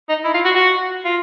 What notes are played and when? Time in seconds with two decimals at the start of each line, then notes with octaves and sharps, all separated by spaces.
0.09 D#4
0.25 E4
0.34 F4
0.45 F#4
0.55 F#4
1.05 F4